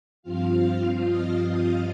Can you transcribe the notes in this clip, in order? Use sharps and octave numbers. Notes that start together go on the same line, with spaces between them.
G2 F3 C4 F4 F5 F6
D#5 D#6